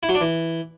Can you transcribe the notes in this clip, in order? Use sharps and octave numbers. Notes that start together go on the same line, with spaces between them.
E4
F#3
D4
E3